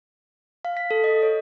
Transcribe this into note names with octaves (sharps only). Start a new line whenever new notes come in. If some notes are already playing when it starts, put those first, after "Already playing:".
F5
B6
A4
D#5
C#5